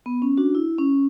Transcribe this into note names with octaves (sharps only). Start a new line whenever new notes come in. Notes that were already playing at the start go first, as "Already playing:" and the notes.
B3
C#4
D4 F#4
E4
C#4